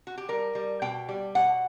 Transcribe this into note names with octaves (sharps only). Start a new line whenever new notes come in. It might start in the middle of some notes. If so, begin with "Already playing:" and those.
F#4
G4
G3 A#4
G3
B2 G5
G3
B2 F#5